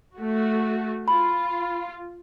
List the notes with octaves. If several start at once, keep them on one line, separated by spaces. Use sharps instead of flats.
A3 F#4
F4 B5